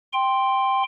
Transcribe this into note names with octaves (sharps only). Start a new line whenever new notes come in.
G5 C6